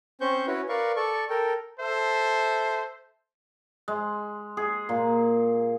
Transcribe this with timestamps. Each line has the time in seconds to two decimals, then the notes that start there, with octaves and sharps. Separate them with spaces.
0.21 C4 C#4 C5 C#6 G6
0.47 C#4 E4 F#4 B4 C#5
0.69 A#4 B4 D5 F5 C#6
0.96 A4 D5 C#6
1.30 A4 A#4 G5
1.79 A4 C5 E5
3.88 G#3
4.57 G#4
4.89 A#2